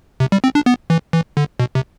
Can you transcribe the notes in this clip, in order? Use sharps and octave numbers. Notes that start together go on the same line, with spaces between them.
C3
G3
C4
D4
B3
E3
E3
D3
B2
C3